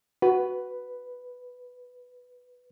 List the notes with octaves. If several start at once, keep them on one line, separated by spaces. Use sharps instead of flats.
F#4 B4